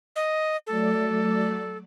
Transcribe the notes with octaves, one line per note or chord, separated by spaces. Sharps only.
D#5
F#3 A3 A4 D5